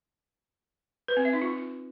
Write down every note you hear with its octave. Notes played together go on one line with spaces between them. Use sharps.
B4
C4
E5
D#4
F4